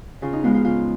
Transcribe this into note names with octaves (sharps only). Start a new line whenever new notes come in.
C#3 F4
D#4
F3 G#3 B3 F4
F4
C#3 F4